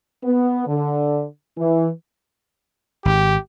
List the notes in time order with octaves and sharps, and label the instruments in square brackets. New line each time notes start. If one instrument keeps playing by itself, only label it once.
[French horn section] B3
D3
E3
[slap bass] G#1 [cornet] G4